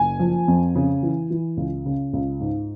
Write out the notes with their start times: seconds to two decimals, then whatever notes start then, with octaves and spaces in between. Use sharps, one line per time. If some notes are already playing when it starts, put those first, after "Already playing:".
Already playing: F#1 G#5
0.19 F3
0.48 F2
0.75 C#3
1.02 E3
1.30 E3
1.57 C#2
1.86 C#3
2.13 C#2
2.41 G#2